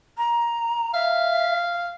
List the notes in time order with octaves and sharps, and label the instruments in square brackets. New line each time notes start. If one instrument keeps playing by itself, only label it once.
[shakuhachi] A#5
[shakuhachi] E5 [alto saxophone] F5